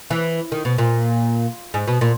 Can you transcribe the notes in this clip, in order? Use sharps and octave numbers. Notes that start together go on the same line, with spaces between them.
E3
D#3
B2
A#2
G#2
B2
A#2